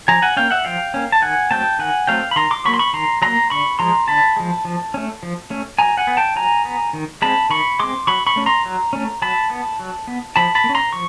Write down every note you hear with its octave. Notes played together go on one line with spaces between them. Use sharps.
F3 G#5 A#5
F#5 G#5
A#3 C#4 F5 G5
E5 F#5
F3 F5 G5
A#3 C#4
A5
D#3 F#5 G#5
F#3 A3 C4 G5 A5
D#3 F#5 G#5
F#3 A3 C4 F5 G5
B5
D#3 A#5 C6
C6 D6
F#3 A#3 B5 C#6
C6
B5 C#6
D#3 A#5 C6
F#3 A#3 A#5 C6
D3 B5 C#6
F3 G#3 A#5 C6
D3 A5 B5
F3 G#3
F3
A3 C#4
F3
A3 C#4
F#3 G#5 A#5
F#5 G#5
B3
G5 A5
F#3 G#5 A#5
B3
D#3
G#3 C4 A5 B5
D#3 B5 C#6
G#3 C4 C6 D6
F#3 B5 C#6
B5 C#6
A3 C#4
A#5 C6
F#3
A3 C#4
F#3 A5 B5
B3
F#3
B3
F3 A5 B5
A5 B5
A#3
C#4
A#5 C6
F3 C#6